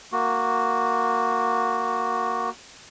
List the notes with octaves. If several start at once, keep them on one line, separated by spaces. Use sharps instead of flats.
A#3 F#4